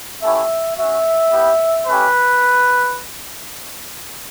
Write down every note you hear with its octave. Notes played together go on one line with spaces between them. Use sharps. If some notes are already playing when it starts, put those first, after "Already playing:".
A3 C#4 E4 G4 E5
C#4 F#4 E5
B3 E4 G4
A3 C#4 G4 B4